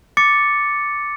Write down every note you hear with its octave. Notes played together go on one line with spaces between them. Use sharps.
D6 A6 C#7